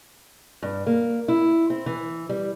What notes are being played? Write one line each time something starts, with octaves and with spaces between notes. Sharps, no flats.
G2
A#3
E4
C4
E3
G3